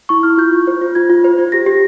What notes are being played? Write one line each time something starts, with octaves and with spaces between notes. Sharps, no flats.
E4 C#6
E4 F6
F4 G6
F4
C5
F4
F4 G#6
F4
C5
F4
G4 A#6
G4